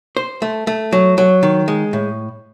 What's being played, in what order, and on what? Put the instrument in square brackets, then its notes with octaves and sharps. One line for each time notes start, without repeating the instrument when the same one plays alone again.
[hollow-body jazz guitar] C5
A3
A3
F#3
F#3
D#3
G#3
A2